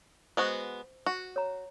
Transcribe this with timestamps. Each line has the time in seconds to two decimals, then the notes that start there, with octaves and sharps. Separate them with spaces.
0.37 G#3 B3 F#4 C5
1.06 F#4
1.36 C#5 A#5